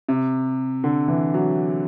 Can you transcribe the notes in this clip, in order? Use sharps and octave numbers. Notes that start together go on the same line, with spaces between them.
C3
D3
E3
F#3